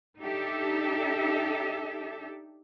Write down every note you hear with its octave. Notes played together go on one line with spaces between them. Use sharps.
D4 D#4 G4 A4 E5